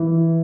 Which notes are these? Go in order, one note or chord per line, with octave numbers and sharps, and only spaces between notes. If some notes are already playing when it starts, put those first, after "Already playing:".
Already playing: E3